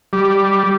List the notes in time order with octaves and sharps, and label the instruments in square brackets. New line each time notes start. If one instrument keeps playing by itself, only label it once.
[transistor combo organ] G3